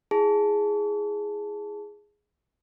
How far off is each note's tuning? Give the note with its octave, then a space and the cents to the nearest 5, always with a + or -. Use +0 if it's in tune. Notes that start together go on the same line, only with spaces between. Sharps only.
E4 +0 G#4 +0 A5 +0